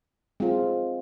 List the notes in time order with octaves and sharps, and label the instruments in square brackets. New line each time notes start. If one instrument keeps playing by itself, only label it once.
[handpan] G#3 C4 F4